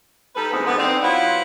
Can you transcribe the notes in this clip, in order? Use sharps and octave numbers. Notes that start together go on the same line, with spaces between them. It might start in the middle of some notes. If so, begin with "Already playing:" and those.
G3 D#4 A4 B4
D2 E3 G#3 A3 B3 C4
D3 G3 G#3 B3
C4 D4 D#4
F#3 E4 F4 B4 C5 F#5